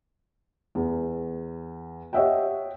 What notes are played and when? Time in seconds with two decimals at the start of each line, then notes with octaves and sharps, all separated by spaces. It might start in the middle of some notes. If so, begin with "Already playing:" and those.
0.75 E2
2.13 G4 C#5 D#5 E5 F#5 G5